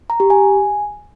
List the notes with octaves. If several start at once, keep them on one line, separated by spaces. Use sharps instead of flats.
A#5
G4
G#5